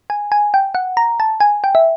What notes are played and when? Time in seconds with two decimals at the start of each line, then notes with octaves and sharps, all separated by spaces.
0.10 G#5
0.32 G#5
0.54 G5
0.75 F#5
0.97 A#5
1.20 A5
1.40 G#5
1.64 G5
1.75 E5